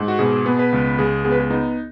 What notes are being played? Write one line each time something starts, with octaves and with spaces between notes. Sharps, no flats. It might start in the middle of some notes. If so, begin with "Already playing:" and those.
Already playing: G#2
F#4
B2 G#4
B3
B4
C#2
C#2 G#4
B3 G#4
B4
G#4
B3 D#4